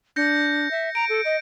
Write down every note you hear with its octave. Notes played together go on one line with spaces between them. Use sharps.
D4 G6 A#6 C#7
E5
A#5 D7
A4
D#5